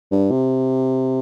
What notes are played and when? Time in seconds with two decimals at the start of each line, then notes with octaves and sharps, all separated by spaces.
0.11 G2
0.31 C3